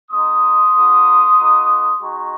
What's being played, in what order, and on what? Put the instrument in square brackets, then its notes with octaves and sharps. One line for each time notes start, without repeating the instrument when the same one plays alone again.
[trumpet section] G#3 C4 D#4 C6 D#6
A#3 D#4 F#4
A#3 D#4 F#4
G#3 D#4 F#4 A#5 C#6